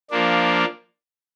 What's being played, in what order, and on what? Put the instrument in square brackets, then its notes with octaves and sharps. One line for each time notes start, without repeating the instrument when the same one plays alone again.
[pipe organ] F3 A#3 D4